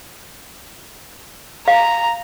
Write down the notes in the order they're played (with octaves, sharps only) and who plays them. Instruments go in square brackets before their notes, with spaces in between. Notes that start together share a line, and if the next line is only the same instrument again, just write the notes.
[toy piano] F5 [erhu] A#5